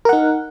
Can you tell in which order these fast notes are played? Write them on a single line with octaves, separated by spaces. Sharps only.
A#4 F#5 D#4